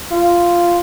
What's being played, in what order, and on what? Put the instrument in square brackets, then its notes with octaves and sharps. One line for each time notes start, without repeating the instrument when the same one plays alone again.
[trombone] F4